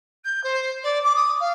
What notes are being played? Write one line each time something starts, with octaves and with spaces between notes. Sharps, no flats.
G6
C5
D5
D6
D#6
F5